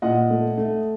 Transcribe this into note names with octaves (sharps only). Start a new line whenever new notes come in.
A#2 D#5 F#5
A3
A3